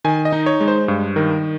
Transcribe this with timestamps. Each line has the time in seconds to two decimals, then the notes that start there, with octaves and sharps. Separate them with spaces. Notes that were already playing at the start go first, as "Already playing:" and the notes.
0.04 D#3 G#5
0.25 D#5
0.33 D#4
0.46 C#5
0.61 G#3
0.68 C5
0.88 G2
1.16 D#3 A#4